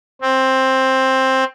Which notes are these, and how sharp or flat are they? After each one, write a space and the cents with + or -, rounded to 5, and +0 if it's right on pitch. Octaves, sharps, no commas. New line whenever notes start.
C4 +10